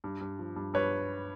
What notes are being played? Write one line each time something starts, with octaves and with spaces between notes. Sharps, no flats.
G2
G2
F3
G2
G2 B4 C#5